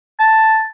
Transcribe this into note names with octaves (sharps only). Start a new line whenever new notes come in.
A5